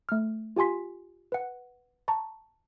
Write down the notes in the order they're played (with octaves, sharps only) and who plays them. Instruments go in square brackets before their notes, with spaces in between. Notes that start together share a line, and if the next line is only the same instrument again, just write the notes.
[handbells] A3 F6
F4 G4 G#5 C6 B6
B4 F#5
A5 A#5 C#6